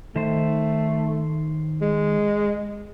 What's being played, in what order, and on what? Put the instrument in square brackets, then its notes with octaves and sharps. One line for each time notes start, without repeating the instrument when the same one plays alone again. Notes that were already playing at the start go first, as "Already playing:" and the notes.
[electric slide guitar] D#3 C5 [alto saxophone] A3
[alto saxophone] G#3